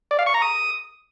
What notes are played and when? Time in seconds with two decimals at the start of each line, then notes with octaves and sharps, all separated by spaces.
0.11 D5
0.19 F5
0.26 C#6
0.34 A#5
0.42 D#6